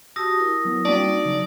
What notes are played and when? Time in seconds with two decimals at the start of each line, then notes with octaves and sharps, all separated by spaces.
0.16 F#4 G4 A5 D#6 E6 A#6
0.39 E4 A#4
0.65 F#3 B3
0.85 G3 A#3 C4 D4 F#4 D5 A5 C#6
1.02 D#4
1.25 C#3 F#3